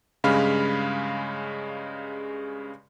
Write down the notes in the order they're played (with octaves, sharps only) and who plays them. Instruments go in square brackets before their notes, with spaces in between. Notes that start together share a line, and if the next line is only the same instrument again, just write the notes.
[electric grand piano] G2 C#3 G#3 F5 B5 F6